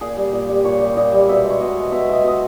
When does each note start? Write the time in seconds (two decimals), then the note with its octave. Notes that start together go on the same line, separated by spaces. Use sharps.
0.01 A#2 G#4
0.16 G3
0.33 A#2
0.49 G3
0.65 A#2 C#5
0.81 G3
0.97 A#2 D#5
1.13 G3
1.29 B2 E5
1.44 G#3
1.50 C#5
1.61 B2 D#5
1.76 G#3
1.92 B2 E5
2.08 G#3 D#5 E5
2.24 B2 D#5